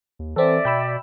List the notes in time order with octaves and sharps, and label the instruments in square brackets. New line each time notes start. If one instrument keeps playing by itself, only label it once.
[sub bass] D#2
[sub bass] E3 [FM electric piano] C4 A4 [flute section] D5 E5
[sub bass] B2 [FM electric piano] G5 B5 E6